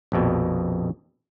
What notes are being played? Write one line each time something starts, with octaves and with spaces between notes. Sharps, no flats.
A#1 F2 B2